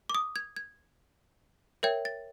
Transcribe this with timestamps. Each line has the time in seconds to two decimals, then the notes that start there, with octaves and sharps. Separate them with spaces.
0.09 D6
0.15 D#6
0.36 G#6
0.56 G#6
1.83 A#4 C#5 E5 G5 G#6
2.05 A6